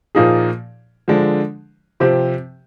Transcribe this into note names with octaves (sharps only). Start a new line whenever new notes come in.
A#2 F3 A#3 D#4 G#4
D3 F3 G#3 D4
C3 F3 C4 G4